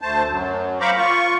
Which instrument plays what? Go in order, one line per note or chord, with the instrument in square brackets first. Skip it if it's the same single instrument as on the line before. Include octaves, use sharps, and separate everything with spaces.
[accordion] D2 A3 C5 A5
F#2 F#3
C5 F5 A#5 B5 C#6 D6
F4 C#6